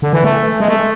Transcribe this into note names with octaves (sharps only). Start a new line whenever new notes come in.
D3
E3
A3
G#3
A3